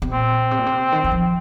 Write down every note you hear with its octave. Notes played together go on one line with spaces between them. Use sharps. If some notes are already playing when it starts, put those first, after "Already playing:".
C3
A#2 C4
C3
A#2
C3
D#3
D#3
F3